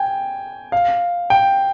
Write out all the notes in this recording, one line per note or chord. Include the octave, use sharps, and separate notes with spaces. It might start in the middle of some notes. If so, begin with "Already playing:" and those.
Already playing: G5 G#5
F5
G5